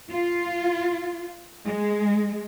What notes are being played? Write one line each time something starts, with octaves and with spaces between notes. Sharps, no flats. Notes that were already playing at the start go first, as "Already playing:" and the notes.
F4
G#3